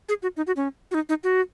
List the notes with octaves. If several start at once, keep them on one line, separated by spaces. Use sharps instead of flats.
G#4
F#4
D#4
F#4
C#4
F#4
D#4
D#4
F#4